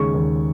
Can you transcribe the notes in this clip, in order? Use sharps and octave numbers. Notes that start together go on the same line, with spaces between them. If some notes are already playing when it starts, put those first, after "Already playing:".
Already playing: D#2 C#3 G#3 C#6
D#2